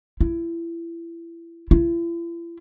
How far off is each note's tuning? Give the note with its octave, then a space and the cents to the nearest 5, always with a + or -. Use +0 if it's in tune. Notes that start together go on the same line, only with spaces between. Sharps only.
E4 +25
E4 +40